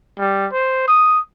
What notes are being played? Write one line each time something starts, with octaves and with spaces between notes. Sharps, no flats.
G3
C5
D#6